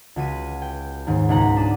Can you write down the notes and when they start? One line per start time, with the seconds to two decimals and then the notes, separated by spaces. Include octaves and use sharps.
0.16 C#2 F#4 B6 D#7
0.32 B4
0.62 G5
1.07 D#2 G#2 G#3
1.29 C#2 B2 D#4 F#5 A#5 B6
1.56 D4 D#6 E7